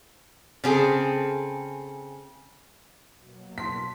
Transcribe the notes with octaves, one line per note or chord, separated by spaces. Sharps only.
C#3 C4 G#4 A4
B2 F#3 A#3
A5 C6 B6